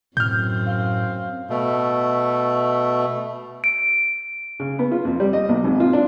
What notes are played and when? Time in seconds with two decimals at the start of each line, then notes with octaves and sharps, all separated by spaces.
0.17 F#2 A2 C4 F6 G6
0.66 F5
1.50 B2 A3
3.64 D7
4.60 C#3
4.79 B3
4.91 F4
5.05 F2
5.20 G3
5.33 D#5
5.49 B1
5.64 G#1
5.80 F4
5.93 D4